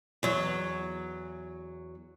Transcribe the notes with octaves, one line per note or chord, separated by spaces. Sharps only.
E2 F#3